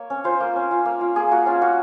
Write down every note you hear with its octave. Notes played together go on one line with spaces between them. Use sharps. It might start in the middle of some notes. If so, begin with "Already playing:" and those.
Already playing: A#3 C#5
C#4
F4 C5
A#3
C#4
F4
A#3
F4
A#3 G#4
A#3 F#4
C#4 F4
A#3 F#4